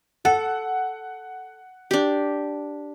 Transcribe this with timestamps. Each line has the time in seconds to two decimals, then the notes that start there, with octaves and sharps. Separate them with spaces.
0.25 A4 F#5
1.91 D4 G4